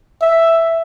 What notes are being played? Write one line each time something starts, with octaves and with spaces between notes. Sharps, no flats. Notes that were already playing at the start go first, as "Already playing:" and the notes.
E5